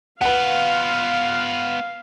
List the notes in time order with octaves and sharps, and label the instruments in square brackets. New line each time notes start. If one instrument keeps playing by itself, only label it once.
[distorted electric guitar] B3 F4 [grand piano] B4 F#5 [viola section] F5